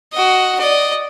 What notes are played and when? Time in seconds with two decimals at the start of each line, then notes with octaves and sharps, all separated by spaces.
0.13 F#4 D#5
0.59 D5 D#5